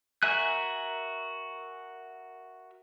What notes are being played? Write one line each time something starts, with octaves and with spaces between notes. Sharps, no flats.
F#4 A#4 E5 G#5 F#6